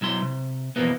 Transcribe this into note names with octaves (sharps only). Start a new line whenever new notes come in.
B1 F#3 E4 C6
C3
F2 G#2 B2 E3 A#3 B3